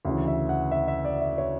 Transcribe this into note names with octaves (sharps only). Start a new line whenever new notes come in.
D2 C#3 E3
E5
F#5
E5
E5
D5
E5
C#5